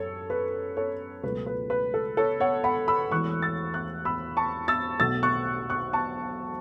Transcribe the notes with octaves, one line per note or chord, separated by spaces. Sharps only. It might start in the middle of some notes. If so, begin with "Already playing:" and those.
Already playing: F#2 A4 C#5
B4
A4 C#5
C#2 B2 F#3 A3 B4
B4
B4
A4
A4 C#5
C#5 F#5
F#5 B5
B5 E6
E1 E2 E3 A3 C#6 F#6
E6 A6
C#6 F#6
B5 E6
A5 C#6
E6 A6
B1 B2 A3 E6 A6
C#6 F#6
C#6 F#6
A5 C#6